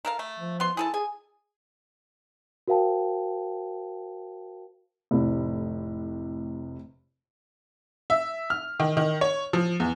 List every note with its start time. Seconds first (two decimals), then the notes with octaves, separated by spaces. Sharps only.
0.05 A4 A#4 F5
0.19 A3
0.39 F3
0.60 B3 C6
0.77 E4 G#4 A4 A5
0.94 G#4 G#5
2.68 F#4 A#4 C5 F5 G5 A5
5.11 F1 A2 C3
8.10 E5
8.50 F6
8.80 D#3
8.97 D#3
9.21 C#5
9.53 F3
9.80 E2